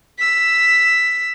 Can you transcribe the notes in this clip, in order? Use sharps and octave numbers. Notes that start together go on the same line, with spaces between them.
E6 B6